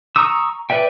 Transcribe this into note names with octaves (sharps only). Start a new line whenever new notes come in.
A#5 C#6 D#6 E6
B4 D5 E5 G5